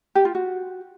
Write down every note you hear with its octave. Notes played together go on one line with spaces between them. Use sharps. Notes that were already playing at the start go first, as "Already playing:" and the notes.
G4
F4
F#4